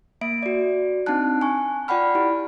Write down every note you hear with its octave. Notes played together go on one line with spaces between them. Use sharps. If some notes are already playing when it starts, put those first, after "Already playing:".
A#3 E5 D7
F#4 D5
C4 D4 D#4 A5 F#6
G#5 C#6
F4 D5 F#5 G5 B5 F6
E4 G4